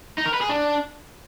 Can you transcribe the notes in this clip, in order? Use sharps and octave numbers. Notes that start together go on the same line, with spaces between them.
D#4
A#4
B4
G#4
D4